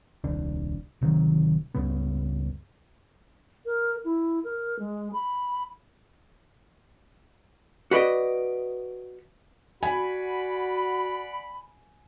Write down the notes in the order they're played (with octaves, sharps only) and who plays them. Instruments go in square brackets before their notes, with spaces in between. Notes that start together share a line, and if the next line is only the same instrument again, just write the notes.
[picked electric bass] D#1 C2 D4
D1 C3 D#3 F#3
C#2 G2 C#3 B3
[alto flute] A#4
E4
A#4
G#3
B5
[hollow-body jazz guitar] F#4 B4 D5 D#5
[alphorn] F#4 [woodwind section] D5 F#5 B5 [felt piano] G#5